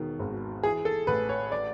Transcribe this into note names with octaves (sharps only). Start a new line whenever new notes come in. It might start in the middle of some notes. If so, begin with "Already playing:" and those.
Already playing: E1 B2 D#3
G#1
E3 G#4
A4
A1 B4
C#5
D5